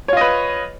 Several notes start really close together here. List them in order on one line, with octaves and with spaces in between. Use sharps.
C#5 F4 D#5 B4